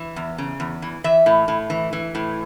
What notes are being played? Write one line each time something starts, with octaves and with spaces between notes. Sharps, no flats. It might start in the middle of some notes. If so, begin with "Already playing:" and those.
Already playing: E3
E2
C#3
E2
E3
E3 E5
A2
A2
E3
E3
A2